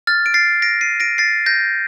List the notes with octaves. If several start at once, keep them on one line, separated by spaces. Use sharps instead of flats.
F6 A6
D7
A6 C7
A#6 D7
C7 D#7
A#6 D7
A6 C7
G6 A#6